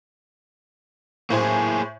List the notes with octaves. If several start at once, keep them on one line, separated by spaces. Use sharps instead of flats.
A2 A#3 G#4 C5 G#5